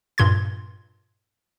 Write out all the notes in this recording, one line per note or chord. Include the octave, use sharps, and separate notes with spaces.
G2 A#2 C6 G#6